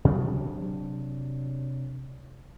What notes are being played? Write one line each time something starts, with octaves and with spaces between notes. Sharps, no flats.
C3 F#3 D4